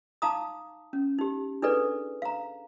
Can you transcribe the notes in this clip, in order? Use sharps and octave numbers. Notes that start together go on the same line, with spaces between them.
D#4 F5 A5 A#5 D6 D#6
C#4
D#4 G4
D4 E4 G#4 A4 B4 D5
F5 A#5